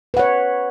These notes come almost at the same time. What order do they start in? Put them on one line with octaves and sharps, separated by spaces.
B4 F#5 C#5